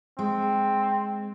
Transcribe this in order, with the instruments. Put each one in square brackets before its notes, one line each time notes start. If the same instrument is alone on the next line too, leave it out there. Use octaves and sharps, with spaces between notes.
[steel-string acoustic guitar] G#3 [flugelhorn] C4